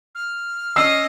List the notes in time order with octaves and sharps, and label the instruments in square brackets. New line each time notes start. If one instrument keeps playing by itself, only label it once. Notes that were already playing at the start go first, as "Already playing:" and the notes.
[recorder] F6
[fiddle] C#4 D#5 [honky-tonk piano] E6 C7 E7